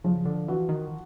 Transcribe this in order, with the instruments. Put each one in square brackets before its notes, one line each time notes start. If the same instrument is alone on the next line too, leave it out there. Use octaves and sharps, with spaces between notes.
[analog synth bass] C#3 [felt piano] F3
[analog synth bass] D3
[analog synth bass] E3 [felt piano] F#4
[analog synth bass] D#3